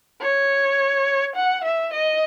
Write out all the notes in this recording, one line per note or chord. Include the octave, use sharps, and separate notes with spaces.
C#5
F#5
E5
D#5